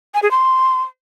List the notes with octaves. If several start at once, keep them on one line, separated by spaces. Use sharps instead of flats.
G#5
G#4
C6